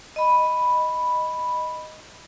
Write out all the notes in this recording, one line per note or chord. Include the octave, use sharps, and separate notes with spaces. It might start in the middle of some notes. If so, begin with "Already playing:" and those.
D#5 B5